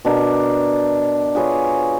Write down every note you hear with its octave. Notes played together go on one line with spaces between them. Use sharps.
B2 D4 A#4
F4 G#4 B4 C#5